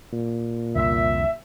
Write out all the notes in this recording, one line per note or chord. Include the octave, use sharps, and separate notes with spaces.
A#2
C2 F2 D3 E5